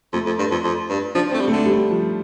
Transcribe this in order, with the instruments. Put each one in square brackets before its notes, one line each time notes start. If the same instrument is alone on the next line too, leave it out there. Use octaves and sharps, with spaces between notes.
[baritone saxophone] F2 [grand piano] A3
[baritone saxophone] F2
G2
F2
F2
G2
[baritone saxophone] F3 [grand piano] D4
[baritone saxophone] A3 [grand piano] C4
[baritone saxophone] G3
[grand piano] A3
[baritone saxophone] D3
[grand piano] G3
F3